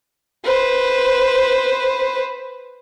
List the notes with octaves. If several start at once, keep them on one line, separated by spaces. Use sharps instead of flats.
B4 C5